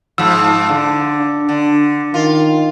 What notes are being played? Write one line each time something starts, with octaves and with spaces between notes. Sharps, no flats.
G#2 F3 E6
D3
D4
D3
D#3 F4